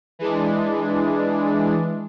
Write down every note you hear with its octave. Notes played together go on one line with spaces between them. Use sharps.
E3 G#3 D4